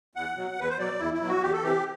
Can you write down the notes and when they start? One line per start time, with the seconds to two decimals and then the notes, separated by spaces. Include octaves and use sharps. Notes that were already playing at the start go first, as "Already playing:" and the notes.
0.15 E2 F#5
0.36 B2 F#3
0.58 E2 B4
0.69 C5
0.79 B2 F#3 D5
0.99 E2 E4
1.14 E4
1.21 B2 F#3
1.28 F#4
1.42 E2 G4
1.53 A4
1.62 C3 E3 G4